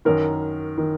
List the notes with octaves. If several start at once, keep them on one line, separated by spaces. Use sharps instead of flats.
F#2 D#3 A#4
D#3